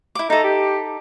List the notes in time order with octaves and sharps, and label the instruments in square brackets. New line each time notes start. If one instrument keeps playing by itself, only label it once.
[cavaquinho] E4 D6
[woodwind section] A3 D#5 A#5 [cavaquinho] D#4 A4
[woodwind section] G4